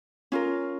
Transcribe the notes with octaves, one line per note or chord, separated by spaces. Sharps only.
C#4 F4 A#4